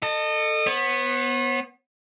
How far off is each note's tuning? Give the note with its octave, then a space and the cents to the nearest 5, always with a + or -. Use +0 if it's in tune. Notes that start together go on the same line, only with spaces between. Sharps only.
A4 +15 D#5 -30
B3 +0 C#5 -45